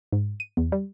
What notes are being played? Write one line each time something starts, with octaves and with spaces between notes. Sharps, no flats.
G#2
D#7
E2
G3